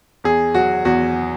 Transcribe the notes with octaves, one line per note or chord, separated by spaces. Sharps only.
E2 G#4
F#3 F#4
E2 F#4